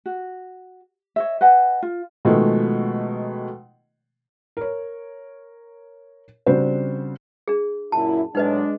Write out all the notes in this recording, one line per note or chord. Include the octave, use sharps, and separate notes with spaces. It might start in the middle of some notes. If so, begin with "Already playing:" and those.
F#4
C#5 D#5 E5
B4 D#5 F#5 G#5
F4
B2 D#3 F3 G#3 A3
A#4 C#5
C#3 G3 C4 D4 F#4 C5
D4 G#4
F#2 A#2 E4 A5
A2 F#3 G#3 D4 D#4 B4 D#5